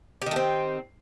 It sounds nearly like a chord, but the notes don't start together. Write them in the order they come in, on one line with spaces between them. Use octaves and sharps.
G4 D#3 A3 C4